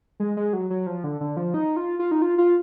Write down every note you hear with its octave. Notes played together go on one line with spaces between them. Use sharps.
G#3
G#3
F#3
F#3
F3
D3
D3
F3
D#4
F4
F4
D#4
F4
F4